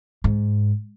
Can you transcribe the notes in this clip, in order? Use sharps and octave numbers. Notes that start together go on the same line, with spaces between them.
G#2